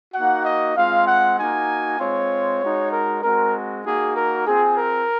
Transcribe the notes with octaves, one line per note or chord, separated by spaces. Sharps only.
A#3 D#4 F#4 F#5
D#5
G#3 C4 F4 F5
F#5
A#3 D#4 F#4 G#5
G#3 C4 F4 C#5
G#3 D#4 F#4
A#4
G#3 C4 F#4 A#4
A#3 D#4 F#4 G#4
A#4
C4 F4 G#4
A#4